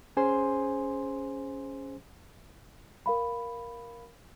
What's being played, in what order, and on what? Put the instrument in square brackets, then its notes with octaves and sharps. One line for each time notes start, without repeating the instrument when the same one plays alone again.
[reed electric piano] C#4 G#4 C5 G#5 C6
[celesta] A#4 F5 B5